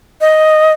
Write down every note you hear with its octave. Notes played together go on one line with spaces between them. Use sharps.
D#5